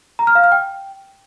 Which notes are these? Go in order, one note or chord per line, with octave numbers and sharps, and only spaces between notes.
A#5
F6
F5
F6
G5